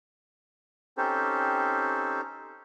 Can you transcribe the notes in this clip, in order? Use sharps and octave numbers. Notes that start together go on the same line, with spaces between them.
C4 C#4 D#4 G4 A4 C5